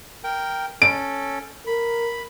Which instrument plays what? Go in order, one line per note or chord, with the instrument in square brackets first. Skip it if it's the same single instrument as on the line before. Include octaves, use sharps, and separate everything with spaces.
[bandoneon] A#4 G5
[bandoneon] C#4 A4 [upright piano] D7
[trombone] A#4 [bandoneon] B5